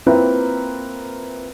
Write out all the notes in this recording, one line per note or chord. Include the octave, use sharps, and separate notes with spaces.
A#3 C4 E4 F4 A#4 B4